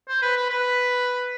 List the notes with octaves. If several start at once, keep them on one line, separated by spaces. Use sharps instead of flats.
C5
B4
B4
B4